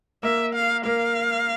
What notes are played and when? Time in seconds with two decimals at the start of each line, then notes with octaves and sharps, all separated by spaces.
0.23 A#3 E5
0.55 F5
0.85 A#3 F5